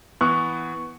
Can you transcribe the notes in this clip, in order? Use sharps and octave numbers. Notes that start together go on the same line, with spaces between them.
E3 B3 C#6 F#6